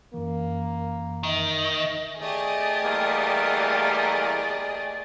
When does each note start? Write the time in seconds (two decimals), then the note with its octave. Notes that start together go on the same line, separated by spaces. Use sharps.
0.14 F#2 E3 A#3
1.23 D#3 D#5 E5
2.20 A3 G4 G#4 D5 D#5
2.81 E2 G3 A#3